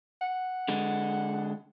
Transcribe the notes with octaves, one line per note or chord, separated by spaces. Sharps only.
F#5
D3 G#3